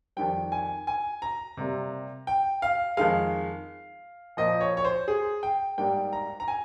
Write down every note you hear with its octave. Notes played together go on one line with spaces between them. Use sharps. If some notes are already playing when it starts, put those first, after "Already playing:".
F2 D#3 G3 G5
G#5
G#5
A#5
C3 G3 A#3
G5
F5
F2 D#3 G#3 F5
A#2 F3 A#3 D#5
C#5
C#5
C5
G#4
G5
G#2 G3 A#3 G5
A#5
A#5
G#5